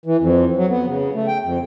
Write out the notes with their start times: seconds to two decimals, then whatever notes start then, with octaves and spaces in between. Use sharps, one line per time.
0.06 E3
0.20 F2
0.57 F#3
0.69 B3
0.87 C#3
1.14 A3
1.27 G5
1.43 F2